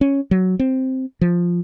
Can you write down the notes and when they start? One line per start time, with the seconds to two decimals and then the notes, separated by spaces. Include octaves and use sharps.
0.01 C#4
0.31 F#3
0.59 C4
1.21 F3